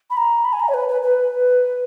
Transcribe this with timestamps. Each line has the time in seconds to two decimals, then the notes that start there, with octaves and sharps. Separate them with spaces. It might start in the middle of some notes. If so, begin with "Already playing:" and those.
0.10 B5
0.17 A#5
0.45 B5
0.53 G#5
0.60 A#5
0.68 C#5
0.74 B4
0.89 B4
1.03 B4